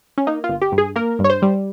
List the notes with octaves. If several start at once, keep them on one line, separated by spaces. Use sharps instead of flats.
C#4
A#3 D#4
F4
G1
G4
G2
G#4
A#3 A#4
G2
C#5
C5
G3